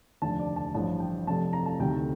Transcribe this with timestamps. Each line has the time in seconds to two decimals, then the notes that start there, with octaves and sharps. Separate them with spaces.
0.22 F1 D#2 D3 F3 A5
0.39 D5
0.56 A5
0.74 A1 G2 F3 A5
1.00 G5
1.27 F1 F2 C3 A5
1.53 A#5
1.66 A5
1.80 D2 C3 D#3 G5